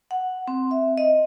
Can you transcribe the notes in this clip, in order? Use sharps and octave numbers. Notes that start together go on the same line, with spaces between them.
F#5
C4
E5
D#5